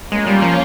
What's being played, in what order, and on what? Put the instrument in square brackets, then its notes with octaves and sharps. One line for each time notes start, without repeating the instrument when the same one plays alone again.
[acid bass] G#3 [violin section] A#3 C#4 F4
[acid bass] G3
F3